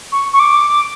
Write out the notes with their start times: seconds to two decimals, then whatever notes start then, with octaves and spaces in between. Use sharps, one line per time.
0.12 C#6
0.33 C#6
0.40 D6